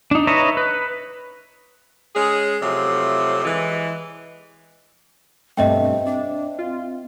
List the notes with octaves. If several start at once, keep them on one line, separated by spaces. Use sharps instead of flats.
D4 D#4
B4 C#5 D#5 E5 A#5
B4
G#3 C#4 G#4
C3 F3 F#3 A3
E3 G#3
G2 B2 A3 C4 D#5 E5 G5
C4 D4
F4